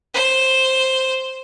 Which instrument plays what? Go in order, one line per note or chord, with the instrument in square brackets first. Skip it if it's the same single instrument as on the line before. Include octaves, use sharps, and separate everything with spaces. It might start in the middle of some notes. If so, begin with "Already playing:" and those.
[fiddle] C5